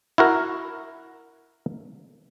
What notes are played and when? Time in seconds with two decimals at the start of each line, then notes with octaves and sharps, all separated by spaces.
0.18 E4 F#4 A#4